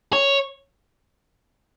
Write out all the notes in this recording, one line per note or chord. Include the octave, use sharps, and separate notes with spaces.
C#5